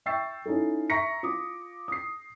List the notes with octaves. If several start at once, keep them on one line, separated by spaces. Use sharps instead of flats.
E5 G5 C#6 E6 A6 C7
C#4 D#4 E4 A4
E5 A#5 C#6 A#6 B6 C#7
F4 D6 D#6
D#6 C7